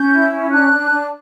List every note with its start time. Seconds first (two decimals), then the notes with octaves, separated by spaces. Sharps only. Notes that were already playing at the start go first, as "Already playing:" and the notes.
Already playing: C#4 G6
0.12 E4
0.32 C#4
0.51 D4 F#6
0.71 D4
0.90 D4